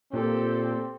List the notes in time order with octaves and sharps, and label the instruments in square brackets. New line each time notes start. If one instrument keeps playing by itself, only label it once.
[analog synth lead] A#2 [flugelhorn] C4 [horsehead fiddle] G4 A4